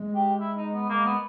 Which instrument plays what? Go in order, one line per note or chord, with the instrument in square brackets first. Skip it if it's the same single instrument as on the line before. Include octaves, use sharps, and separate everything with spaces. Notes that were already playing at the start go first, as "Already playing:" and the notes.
Already playing: [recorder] G#3
[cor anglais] G4
E4
D#4
B3
[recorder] G#3 [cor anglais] A#3
[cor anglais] B3